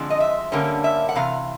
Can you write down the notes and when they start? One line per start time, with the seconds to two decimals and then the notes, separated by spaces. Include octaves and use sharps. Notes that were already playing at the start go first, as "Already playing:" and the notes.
Already playing: D3 F3 G#3 C4
0.10 D#5
0.20 E5
0.52 D3 G3 A#3 C#4
0.84 E5
1.09 F#5
1.15 C3 E3 F5